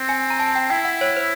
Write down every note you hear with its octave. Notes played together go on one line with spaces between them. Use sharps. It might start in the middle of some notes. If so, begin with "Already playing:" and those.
Already playing: C4
G#5
A#5
A5
G5
E4 G5
F#5
C#5
C5